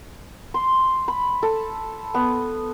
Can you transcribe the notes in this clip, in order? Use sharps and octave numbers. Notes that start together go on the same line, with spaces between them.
C6
B5
A4
B3